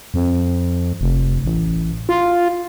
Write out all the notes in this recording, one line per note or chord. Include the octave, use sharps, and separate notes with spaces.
F2
F1
A1
F4